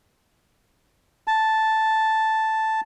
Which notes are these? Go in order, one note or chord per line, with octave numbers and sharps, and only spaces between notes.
A5